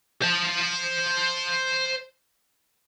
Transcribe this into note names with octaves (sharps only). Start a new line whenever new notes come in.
C5 A5